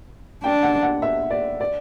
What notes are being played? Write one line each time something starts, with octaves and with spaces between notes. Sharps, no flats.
D4 G5
F#5
F#5
E5
D5
D5